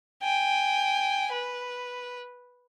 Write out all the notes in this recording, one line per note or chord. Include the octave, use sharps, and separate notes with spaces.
G5 G#5
B4